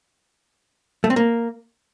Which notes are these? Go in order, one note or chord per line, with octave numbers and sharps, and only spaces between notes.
A3
C4
A#3